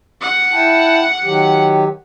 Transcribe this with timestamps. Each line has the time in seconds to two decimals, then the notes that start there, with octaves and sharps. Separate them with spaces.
0.21 F#5
0.53 E4 G5 A5
1.23 D#3 F#3 G4